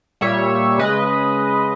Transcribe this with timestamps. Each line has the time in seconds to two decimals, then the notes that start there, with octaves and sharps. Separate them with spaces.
0.21 A#2 G3 C#5 E5
0.78 C#3 G#3 B4 D#5